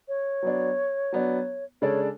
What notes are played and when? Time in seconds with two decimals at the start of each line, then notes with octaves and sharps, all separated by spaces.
0.08 C#5
0.43 F#3 B3 D4
1.12 F#3 B3 D4
1.82 C#3 G#3 D4 A4 C#5 D5